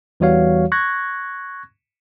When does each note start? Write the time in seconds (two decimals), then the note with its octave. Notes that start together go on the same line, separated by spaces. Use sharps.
0.20 E2 E3 G3 F#4 C#5 F5
0.72 C#6 F#6 G#6 A#6